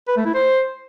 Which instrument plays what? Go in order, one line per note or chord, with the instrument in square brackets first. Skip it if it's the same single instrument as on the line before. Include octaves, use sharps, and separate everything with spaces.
[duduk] B4
A3
E4
C5